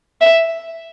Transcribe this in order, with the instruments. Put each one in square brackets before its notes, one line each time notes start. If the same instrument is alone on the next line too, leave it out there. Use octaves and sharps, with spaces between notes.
[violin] E5